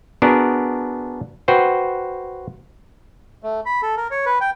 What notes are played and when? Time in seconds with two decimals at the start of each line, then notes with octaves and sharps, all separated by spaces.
0.22 B3 D4 F#4 G#4 A#4
1.48 F#4 B4 C5 G5
3.43 A3
3.66 B5
3.82 A4
3.97 A#4
4.11 C#5
4.26 B4
4.41 G5